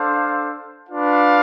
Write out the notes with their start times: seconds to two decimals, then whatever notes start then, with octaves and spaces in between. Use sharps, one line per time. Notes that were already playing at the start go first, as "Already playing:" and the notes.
Already playing: D4 A4 C5 F5
0.89 D4 F4 B4 F5